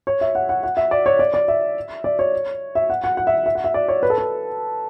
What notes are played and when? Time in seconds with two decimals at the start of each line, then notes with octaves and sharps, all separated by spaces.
0.07 C#5
0.21 E5
0.35 F#5
0.49 F#5
0.63 F#5
0.77 E5
0.91 D5
1.06 C#5
1.19 D5
1.34 D5
1.48 E5
2.04 D5
2.19 C#5
2.75 E5
2.90 F#5
3.04 F#5
3.17 F#5
3.27 E5
3.46 E5
3.55 F#5
3.64 E5
3.74 D5
3.88 C#5
4.03 B4
4.10 A4
4.18 B4